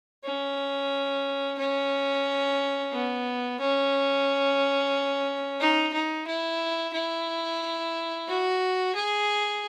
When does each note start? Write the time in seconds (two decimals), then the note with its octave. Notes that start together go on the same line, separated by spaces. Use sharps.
0.24 C#4
1.58 C#4
2.92 B3
3.60 C#4
5.60 D#4
5.93 D#4
6.27 E4
6.94 E4
8.28 F#4
8.95 G#4